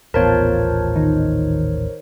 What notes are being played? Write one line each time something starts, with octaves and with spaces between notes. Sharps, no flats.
D#1 A1 B3 F4 A#4 C5 C#5 A5
D#3 D#4